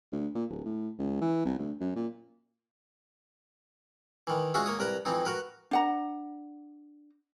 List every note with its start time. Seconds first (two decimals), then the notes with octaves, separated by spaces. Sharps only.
0.12 D2
0.35 A#2
0.50 D1
0.65 A2
0.99 C#2
1.21 E3
1.45 C2
1.59 D2
1.81 F#2
1.96 A#2
4.27 D#3 E3
4.54 G#3 C#4 F4 F#4 E5
4.66 A#3 C#5 D#6
4.79 C2 A#4 B4 A#5
5.05 F2 E3 C4 D#4
5.25 F#4 A#4 B4
5.71 D4 F#5 A#5